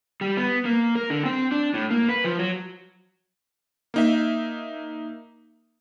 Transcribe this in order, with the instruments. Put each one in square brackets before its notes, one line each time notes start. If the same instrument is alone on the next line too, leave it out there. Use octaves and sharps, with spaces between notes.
[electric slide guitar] G3
B3
A#3
A#4
D3
C4
D4
A2
A#3
B4
F3
F#3
[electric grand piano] A#3 D#4 E5